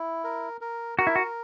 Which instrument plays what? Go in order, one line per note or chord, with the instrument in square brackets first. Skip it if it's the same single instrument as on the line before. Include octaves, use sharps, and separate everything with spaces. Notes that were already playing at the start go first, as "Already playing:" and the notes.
Already playing: [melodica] E4
A#4
A#4
[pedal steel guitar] F#4 [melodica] A#4
[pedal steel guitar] E4
F#4